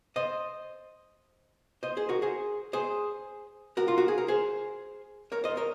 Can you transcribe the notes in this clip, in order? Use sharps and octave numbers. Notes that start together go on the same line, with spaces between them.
C5 D#5
C5 D#5
G#4 C5
F#4 A#4
G#4 C5
G#4 C5
F#4 A#4
F4
F#4
G#4
A#4
G#4 C5
A#4 C#5
C5 D#5
A#4 C#5